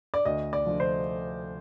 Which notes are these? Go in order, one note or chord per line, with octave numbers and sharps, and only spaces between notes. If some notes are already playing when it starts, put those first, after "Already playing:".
D5
D2 D#5
D5
D3 F3
C5